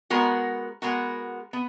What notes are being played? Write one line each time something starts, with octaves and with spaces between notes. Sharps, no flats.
G#3 B3 F#4 A#4
G#3 B3 F#4 A#4
B3